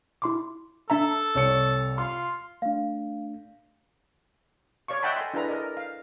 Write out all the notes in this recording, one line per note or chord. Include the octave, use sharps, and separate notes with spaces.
E4 C6 D6
D4 A4 E5 A#5
C2 C#5 C#7
F4 C6
A3 D4 F5
C#5 D5 F5 C#6
D#5 E5 F#5 G5 A5 B5
A4 G#5 C6
D4 E4 G#4 A4 B4 A#5
A4 A#4 D5 D#5
F5